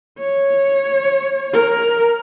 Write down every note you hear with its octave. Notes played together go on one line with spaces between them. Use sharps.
C#5
A#4